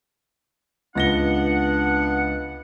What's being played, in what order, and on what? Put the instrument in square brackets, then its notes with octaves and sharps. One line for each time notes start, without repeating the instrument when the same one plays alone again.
[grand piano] C#2 A#6 G7 [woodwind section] B3 D4 F#5